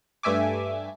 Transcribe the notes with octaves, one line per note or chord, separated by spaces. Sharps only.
G2 A3 E5 G#5 D6